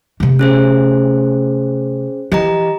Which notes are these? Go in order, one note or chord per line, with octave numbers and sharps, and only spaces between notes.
C3 A3
C#4 G#4 C5
E3 G4 D#5 A#5